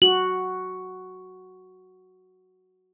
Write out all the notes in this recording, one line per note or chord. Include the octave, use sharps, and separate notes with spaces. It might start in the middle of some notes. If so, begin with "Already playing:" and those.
F#4 F#7